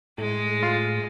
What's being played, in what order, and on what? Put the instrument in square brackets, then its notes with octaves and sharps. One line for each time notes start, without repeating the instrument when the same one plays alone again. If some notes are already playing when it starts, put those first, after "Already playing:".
[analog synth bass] A2 [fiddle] G#3
[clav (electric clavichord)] F4